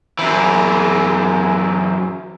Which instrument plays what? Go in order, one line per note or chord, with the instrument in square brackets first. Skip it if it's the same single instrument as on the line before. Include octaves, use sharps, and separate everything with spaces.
[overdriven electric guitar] F#2 E3